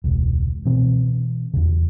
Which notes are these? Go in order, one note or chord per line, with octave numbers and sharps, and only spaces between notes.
E1 C#2
B2 E3 C4
E2 C#3